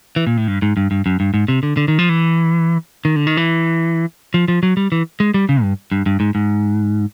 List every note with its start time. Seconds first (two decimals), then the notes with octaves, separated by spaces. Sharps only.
0.16 E3
0.27 A#2
0.37 A2
0.48 G2
0.62 G#2
0.77 G2
0.91 G2
1.06 F#2
1.20 G2
1.34 G#2
1.48 C3
1.63 D3
1.77 D3
1.88 D#3
1.99 F3
2.09 E3
3.05 D#3
3.16 D3
3.27 D#3
3.37 E3
4.34 F3
4.48 F3
4.63 F#3
4.77 G3
4.92 E3
5.20 G#3
5.34 G3
5.49 C#3
5.62 G2
5.92 G2
6.06 G2
6.20 G#2
6.35 G#2